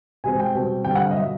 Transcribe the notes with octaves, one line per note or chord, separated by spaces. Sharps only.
B2 G#3 C4 G#5
G5
B2 G3 C4
G2 D3 G3 C4 G5
F#5
F5
D#5
B2 F#3 E5